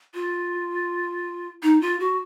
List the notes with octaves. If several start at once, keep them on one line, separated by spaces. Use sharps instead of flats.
F4
D#4
F4
F#4